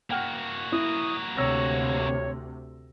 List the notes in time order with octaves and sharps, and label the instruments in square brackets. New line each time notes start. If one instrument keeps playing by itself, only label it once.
[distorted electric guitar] A#3 F#4 [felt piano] F#5 G5 F6
[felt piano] E4 [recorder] D#6
[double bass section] D2 C3 [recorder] C#5 [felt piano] E6 A#6